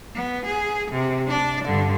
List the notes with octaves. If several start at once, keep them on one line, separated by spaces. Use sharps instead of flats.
B3
G#4
C3
D4 D5
G2 D3